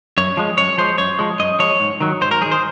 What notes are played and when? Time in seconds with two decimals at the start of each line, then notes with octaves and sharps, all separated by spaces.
0.18 F#2 C#5
0.37 F3 G#3
0.58 F#2 C#5
0.78 F3 G#3 C5
0.98 F#2 C#5
1.19 F3 G#3
1.40 F#2 D#5
1.59 F3 G#3 C#5
1.80 G#2
2.00 D#3 F#3
2.21 G#2 C5
2.31 A#4
2.41 D#3 F#3 G#4
2.52 C5